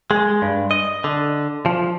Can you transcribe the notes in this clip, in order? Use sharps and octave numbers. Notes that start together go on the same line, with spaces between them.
G#3
G2
D#5
D3
F3